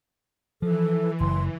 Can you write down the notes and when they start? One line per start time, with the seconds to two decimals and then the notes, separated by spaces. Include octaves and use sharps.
0.62 E3 F3 A4
1.20 F#1 C6